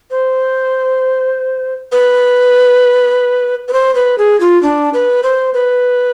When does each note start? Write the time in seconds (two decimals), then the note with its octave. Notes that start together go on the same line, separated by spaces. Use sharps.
0.11 C5
1.92 B4
3.68 B4
3.73 C5
3.95 B4
4.18 G#4
4.40 F4
4.63 D4
4.94 B4
5.23 C5
5.54 B4